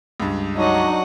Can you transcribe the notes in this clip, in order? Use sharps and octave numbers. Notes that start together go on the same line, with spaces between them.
C#2 G2
F#3 D4 D#4 F#4 D#5 F#5